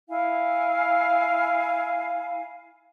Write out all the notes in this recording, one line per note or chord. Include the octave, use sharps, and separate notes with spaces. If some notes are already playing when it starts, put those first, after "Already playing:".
E4 F5 G#5